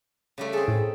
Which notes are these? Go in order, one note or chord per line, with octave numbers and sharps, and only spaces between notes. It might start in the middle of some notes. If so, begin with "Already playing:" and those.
C#3 G3 A3
C4 G#4 A4
A2